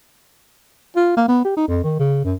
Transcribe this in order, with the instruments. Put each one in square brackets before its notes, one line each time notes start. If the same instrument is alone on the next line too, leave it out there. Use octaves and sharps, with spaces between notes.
[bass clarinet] F4
A#3
B3
G4
D#4
F2
D#3
C#3
F#2